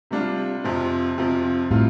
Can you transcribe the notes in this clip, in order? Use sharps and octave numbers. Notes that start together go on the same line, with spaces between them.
C3 G3 D4 F4
F2 C3 F3
F2 C3 F3
A2 C3 G3 F4